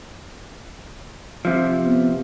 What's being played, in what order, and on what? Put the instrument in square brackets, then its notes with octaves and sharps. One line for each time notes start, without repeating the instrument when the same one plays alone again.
[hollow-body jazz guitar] C3 F3
[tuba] B3